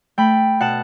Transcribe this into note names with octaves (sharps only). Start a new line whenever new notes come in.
A3 G5 B5
B2 F#5 A5